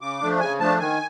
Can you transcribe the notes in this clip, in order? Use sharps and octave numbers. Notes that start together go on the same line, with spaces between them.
C#3 D6
F3 A3 D4
C#3 G#5
F3 A3 D4 A5
D#3 G#5